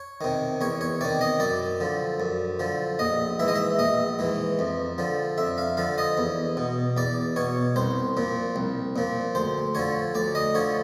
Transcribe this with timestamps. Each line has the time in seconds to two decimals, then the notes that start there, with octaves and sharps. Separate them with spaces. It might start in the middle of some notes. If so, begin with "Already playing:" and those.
Already playing: C#5
0.21 C3 D#3
0.61 E2 C#5
0.81 C#5
1.01 C3 D#3 D5
1.21 D#5
1.40 F#2 D5
1.80 D3 F3
2.20 F#2
2.60 D3 F3
2.99 A#1 D#5
3.39 G#2 E3 E5
3.48 D#5
3.55 E5
3.79 A#1 D#5
4.19 G#2 E3
4.59 F2
4.98 D3 F3
5.38 F2 E5
5.58 F5
5.77 D3 F3 F5
5.98 D#5
6.18 E2
6.57 B2
6.97 E2 D5
7.36 B2 C#5
7.76 C2 C5
8.17 A#2 F3
8.56 C2
8.96 A#2 F3
9.35 D2 C5
9.75 D3 F3 C#5
10.15 D2 D5
10.35 D#5
10.54 D3 F3 C#5